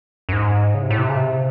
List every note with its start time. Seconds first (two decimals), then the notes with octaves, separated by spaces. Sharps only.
0.29 F#2
0.33 G#2
0.75 C#3
0.83 C3
0.90 A2
0.98 C3
1.10 C#3
1.17 C3